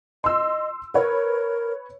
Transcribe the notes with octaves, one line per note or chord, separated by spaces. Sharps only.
D#5 C6 E6
A#4 B4 C#5